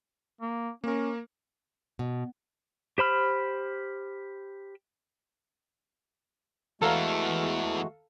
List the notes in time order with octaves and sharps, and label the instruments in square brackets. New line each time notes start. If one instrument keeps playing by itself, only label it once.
[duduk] A#3
[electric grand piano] A#3 A#4 [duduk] C#4
[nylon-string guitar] B2
[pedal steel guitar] G4 C5 B5 F6
[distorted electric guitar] E3 B3 [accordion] G#3 A3 F#4 [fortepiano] A4 F5 A#5